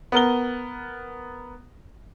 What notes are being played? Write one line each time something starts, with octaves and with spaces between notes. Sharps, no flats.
B3 A#4 G7